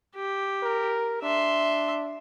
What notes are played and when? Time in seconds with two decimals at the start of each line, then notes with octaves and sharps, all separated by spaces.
0.15 G4
0.63 A#4
1.22 D4 E5 C6